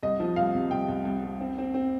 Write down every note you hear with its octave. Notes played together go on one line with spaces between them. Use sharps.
C2 D#5
F3
C2 F5
C3
C2 G5
C2
C2
C2
C4
C4
C4